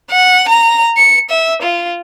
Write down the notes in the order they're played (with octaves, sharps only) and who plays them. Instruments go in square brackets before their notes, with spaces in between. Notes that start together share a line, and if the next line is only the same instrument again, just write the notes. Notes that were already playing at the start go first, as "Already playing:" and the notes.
[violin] F#5
A#5
C#7
E5
F4